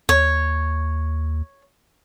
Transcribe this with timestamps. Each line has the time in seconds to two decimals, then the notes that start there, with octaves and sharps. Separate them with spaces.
0.09 D#2 C#5